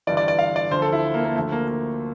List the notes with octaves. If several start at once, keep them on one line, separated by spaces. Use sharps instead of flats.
G1 G2 E3 D5
D5
D5
F5
D5
D2 D3 F3 C5
A4
E4
A#3
A#3
D2 D3 F3 A3
A#3
A#3